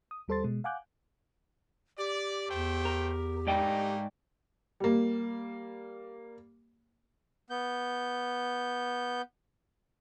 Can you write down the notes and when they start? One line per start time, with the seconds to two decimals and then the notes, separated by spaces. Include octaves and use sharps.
0.11 D#6
0.28 D#2 G3 A4 C5 C6 A6
0.44 B2 G#3
0.64 F5 F#5 G#5 D6 F#6 G6
1.98 G4 D5
2.49 E2 A3 C5 G5
2.85 A#4
3.47 G#2 A3 A#3 D#4 D5 G5
4.80 G3 A#3
7.50 B3 G6